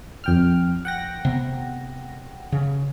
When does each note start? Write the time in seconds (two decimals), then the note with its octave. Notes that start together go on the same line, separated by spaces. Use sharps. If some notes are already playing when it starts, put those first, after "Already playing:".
0.24 F2 G5 F6
0.85 F#5 G5 A#6
1.25 C3 B3
2.52 C#3